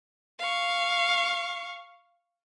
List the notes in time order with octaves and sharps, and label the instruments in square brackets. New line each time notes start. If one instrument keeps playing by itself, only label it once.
[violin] F5 C#6